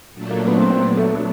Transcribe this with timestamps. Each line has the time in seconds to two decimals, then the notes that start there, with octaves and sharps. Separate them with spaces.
0.14 A#2 F#3 A3 D4
0.31 A#3
0.48 B3
0.58 C4
0.70 C4
0.81 F#3 B3 D4
0.97 A3
1.15 A3